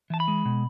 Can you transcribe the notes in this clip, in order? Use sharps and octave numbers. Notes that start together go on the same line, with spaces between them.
E3 A5
B5
G#3
B2